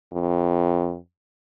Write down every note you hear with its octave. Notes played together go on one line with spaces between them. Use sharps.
F2